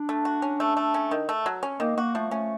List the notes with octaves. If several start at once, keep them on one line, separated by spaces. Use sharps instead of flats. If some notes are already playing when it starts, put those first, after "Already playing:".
Already playing: D4
A3
F#4
C#4
A3
A3
C#4
D#3
A3
F#3
C#4
D#3 A#3
A#3 F#4
F3 A3
A3 C#4